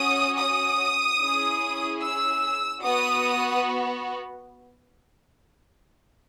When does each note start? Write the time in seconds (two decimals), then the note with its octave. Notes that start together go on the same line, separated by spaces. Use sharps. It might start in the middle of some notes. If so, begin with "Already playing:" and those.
Already playing: C#4 F#4 D#6
0.37 D#6
1.19 C#4 E4 G#4
2.01 E6
2.83 B3 F#4 D#6